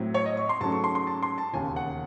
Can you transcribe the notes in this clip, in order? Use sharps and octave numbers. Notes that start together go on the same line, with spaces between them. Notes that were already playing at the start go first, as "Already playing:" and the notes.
Already playing: A2 F#3 C4
C#5
D#5
C#6
C6
G#2 F#3 A3 C#4 A5
C#6
C6
C6
A5
C6
A5
E1 D#2 C#3 G#5
F#5